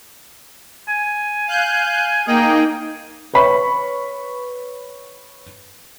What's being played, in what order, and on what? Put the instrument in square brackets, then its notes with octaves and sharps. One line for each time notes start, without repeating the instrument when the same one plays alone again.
[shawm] G#5
[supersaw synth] F5 F#6 G6
[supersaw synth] A#3 D#4 G5 [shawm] G#4
[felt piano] B4 C#5 B5 C#6